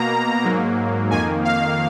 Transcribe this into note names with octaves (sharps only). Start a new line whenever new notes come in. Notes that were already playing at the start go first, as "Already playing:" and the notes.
Already playing: B2 A#3 A#5
G#2 F#3 A#3
F2 D#3 A#3 G#5
F5